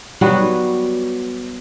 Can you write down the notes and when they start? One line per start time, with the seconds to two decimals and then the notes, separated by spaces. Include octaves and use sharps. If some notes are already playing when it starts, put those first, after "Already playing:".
0.21 F#3 G3 B3 F#4